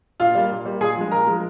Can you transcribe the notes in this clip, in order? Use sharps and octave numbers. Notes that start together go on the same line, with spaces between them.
A#2 F4 F5
G3 A#3
A#2
G3 A#3
A#2 G#4 G#5
F3 G#3
A#2 A#4 A#5
F3 G#3